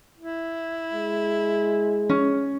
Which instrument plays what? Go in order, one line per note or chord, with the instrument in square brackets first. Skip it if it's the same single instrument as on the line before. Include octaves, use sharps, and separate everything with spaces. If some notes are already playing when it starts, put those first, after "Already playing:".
[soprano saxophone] E4
[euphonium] G#3
[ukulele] C#4